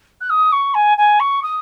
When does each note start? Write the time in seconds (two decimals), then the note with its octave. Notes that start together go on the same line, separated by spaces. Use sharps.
0.21 F#6
0.30 D#6
0.52 C#6
0.75 G#5
0.98 G#5
1.20 C#6
1.43 D#6